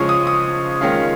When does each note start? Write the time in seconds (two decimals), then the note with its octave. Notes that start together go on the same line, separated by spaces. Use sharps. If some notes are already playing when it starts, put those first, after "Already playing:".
Already playing: C#3 F3 G#3 C#4 C#6
0.09 D#6
0.27 D#6
0.81 D#3 G#3 C#4 F4